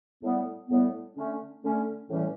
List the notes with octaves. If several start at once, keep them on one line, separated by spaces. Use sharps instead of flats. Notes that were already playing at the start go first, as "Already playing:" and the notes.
A2 G3 B3
A2 G3 B3
D3 A3 C#4
D3 A3 C#4
A2 E3 G3 C#4